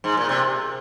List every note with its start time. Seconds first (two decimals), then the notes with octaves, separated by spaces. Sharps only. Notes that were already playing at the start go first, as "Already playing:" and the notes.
0.04 G#2
0.17 A#2
0.29 C3